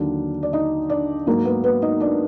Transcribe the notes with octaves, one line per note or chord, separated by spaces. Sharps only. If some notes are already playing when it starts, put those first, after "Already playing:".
Already playing: D#2 D3 F#3 D4
D5
D#4 D#5
D4 D5
G#2 F#3 A#3 A#4
B3 B4
B3 B4
D#4 D#5
D4 D5